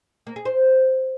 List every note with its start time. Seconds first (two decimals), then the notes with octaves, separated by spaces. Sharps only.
0.27 A#3
0.36 G#4
0.45 C5